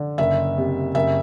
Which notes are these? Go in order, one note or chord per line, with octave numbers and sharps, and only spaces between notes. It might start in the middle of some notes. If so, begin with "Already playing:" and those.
Already playing: D3
F#1 E5
C3
F#1 E5